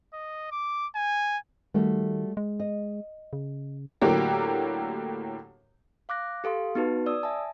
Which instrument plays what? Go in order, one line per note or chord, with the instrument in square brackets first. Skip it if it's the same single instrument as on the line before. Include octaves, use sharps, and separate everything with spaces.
[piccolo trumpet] D#5
D6
G#5
[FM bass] D#3 [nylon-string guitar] G3 A3 F#4
[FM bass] G#3
[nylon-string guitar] D#5
[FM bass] C#3
[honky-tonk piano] A2 D3 F#3 A#3 G4
[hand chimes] F5 D6 F#6 A#6
G4 A4 F5 C6
B3 D#4 F#4 B4 A5
D5 D#6 E6
E5 G#5 A5